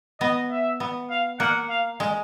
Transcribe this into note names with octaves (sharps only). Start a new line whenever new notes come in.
B3 D#5
E5
B3
F5
A#3 F#5
F5
G#3